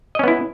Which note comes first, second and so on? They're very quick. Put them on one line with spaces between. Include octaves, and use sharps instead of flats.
D#5 C#4 B3 E4